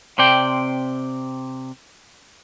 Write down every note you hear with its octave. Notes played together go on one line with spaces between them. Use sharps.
C3 C4 D5 G5